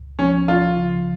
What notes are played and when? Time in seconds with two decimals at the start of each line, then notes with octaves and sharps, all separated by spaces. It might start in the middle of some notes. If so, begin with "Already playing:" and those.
Already playing: C#2
0.19 F3 C#4
0.48 F3 F4
0.77 C#3